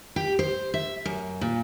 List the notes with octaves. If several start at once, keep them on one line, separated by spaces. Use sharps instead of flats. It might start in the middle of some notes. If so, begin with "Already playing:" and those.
G4
C5
E5
F#2
A#2